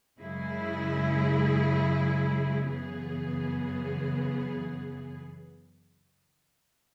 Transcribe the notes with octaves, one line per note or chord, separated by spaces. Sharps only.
F#2 C#3 G#3 E4 G#4
F#2 C#3 E3 B3 G#4